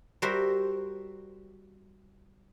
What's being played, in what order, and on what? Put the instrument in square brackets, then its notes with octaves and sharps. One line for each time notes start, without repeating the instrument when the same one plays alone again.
[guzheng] G3 F#4 A#4 C5 E5